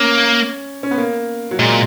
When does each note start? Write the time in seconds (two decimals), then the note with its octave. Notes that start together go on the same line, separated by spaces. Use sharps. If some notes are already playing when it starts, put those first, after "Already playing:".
Already playing: A#3 C#4
0.83 C#4
0.91 B3
0.98 A#3
1.51 F#3
1.59 A#2 G#3